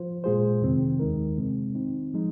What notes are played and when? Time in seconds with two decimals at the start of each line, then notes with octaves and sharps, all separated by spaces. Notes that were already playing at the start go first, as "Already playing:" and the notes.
Already playing: F3 F4 C5
0.24 A#2 G#3 F4 G#4 C5
0.62 F2 C3 D#3 C4
0.99 D#2 D#3 G#3 D#4 A#4
1.37 F2 C3 G#3 C4
1.75 D#3 C4 D#4
2.13 F3 G#3 D#4